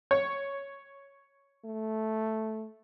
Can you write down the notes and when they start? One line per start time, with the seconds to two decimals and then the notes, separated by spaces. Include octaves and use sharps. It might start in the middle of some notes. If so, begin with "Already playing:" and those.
0.11 C#5
1.65 A3